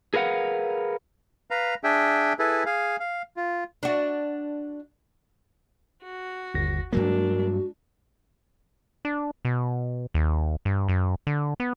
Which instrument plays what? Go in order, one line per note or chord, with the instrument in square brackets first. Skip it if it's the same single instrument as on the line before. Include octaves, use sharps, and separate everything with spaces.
[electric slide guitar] G#4 A#4 B4 F5 F#5
[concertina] B4 F5 A#5
D4 G#4 E5 G5
E4 G#4 A4 B4
G#4 F5
F5
F4
[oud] D4 F#4
[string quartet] F#4
[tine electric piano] G1 D#2 A#6
[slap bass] G2 F#3 A#3 [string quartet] G#3 D4 [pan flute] F#4 [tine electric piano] A#4
[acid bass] D4
B2
D#2
G2
F#2
D3
B3